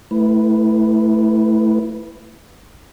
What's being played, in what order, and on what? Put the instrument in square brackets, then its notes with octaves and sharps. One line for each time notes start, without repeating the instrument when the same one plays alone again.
[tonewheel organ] A3 E4 B4